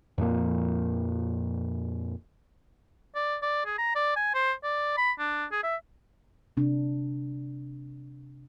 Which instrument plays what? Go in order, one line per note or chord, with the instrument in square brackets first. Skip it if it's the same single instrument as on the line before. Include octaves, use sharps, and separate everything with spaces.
[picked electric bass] F2 A#2 F3 A#3
[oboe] D5
D5
G#4
A#5
D5
G#5
C5
D5
B5
D4
G#4
E5
[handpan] C3 D4